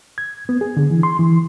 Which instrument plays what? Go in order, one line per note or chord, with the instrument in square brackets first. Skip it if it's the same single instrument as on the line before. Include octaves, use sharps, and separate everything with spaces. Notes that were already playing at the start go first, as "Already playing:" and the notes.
[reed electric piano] G#6
B3
G#4
D3
E3
C6
E3